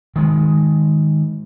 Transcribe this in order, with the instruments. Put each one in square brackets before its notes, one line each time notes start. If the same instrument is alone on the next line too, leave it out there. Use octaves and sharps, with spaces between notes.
[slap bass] D#3 G#3